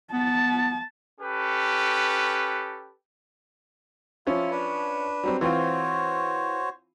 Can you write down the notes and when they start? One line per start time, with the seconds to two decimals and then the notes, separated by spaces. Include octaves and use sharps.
0.13 B3 A5
1.21 C#4 G4 A4 B4
4.27 F3 C#4 E4 F4
4.51 D4 B4
5.24 F#3 G3 C4
5.41 E3 C4 F4 F#4 C5 C#5